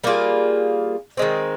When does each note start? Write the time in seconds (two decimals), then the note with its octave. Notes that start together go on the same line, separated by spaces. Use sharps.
0.04 G3 A#3 F4 G#4
1.17 D#3 G#3 C4